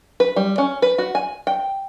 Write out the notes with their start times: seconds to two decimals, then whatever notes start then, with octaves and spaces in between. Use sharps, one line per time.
0.20 B4
0.36 G3
0.58 C#4
0.82 B4
0.98 F#4
1.15 G#5
1.47 G5